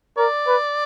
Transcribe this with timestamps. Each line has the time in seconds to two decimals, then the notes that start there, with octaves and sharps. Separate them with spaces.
0.18 A#4 D5
0.47 B4